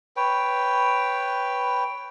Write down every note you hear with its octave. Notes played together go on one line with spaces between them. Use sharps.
B4 C#5 G5